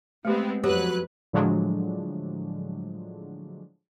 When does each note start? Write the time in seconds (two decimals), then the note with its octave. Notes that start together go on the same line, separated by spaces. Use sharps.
0.25 G#3 A3 B3 C4 G4
0.64 F2 F#3 G4 B4 F#6
1.33 A2 D3 F3 F#3 G#3 D4